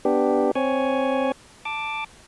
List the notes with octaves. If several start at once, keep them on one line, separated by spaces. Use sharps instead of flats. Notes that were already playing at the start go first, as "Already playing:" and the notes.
B3 D4 G4
C4 C#5 G#5
A5 D6